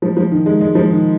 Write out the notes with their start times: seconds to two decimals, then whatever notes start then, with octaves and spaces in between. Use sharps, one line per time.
0.02 F3
0.17 F3
0.31 D#3
0.46 G#3
0.61 G#3
0.75 F3
0.90 D#3